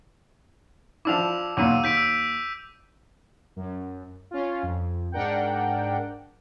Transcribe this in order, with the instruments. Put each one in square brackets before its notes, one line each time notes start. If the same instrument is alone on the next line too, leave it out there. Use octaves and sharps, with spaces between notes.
[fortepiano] F3 D4 E4 [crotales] D6 E6 F7
[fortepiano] B1 E2 A#2 [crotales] D6 E6 D#7
[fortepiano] D#2 [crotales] G6 B6 D7
[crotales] E6
[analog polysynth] F#2
C#4 F4
F2
G#2 D4 A#4 F#5 G5